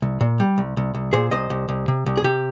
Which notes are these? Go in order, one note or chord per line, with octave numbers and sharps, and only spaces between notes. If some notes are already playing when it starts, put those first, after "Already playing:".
C2
A#2
G3
C2
C2
C2
A#2 G#4 C5
C2 C5 D#5
C2
C2
C3
C2
G#4
C3 G4